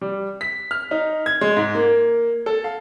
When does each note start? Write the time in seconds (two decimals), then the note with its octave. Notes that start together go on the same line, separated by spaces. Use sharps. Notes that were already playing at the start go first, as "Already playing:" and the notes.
0.01 G3
0.41 B6
0.71 F6
0.91 D#4
1.26 G#6
1.41 G#3
1.57 G#2
1.75 A#3
2.46 A4
2.64 F5